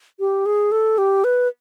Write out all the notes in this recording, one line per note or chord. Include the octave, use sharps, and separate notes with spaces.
G4
G#4
A4
G4
B4